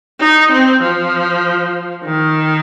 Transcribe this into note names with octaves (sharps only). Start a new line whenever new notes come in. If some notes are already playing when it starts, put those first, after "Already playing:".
D#4
C4
F3
D#3